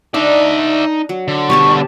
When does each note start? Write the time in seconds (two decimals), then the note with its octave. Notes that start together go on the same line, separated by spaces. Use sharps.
0.14 D4 D#4 D5 E5
1.09 F#3
1.28 D3
1.50 B2 G3 G4 C#5 A5 C#6